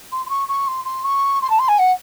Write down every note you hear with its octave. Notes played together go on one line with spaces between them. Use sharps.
C6
C6
C#6
C#6
C6
C6
C#6
C6
A5
C6
G#5
F#5